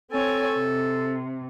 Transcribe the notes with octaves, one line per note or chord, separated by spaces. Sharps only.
C4 A4 C#5 G#5
C3